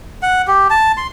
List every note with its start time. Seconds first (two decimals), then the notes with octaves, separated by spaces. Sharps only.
0.22 F#5
0.47 G4
0.70 A5
0.97 C6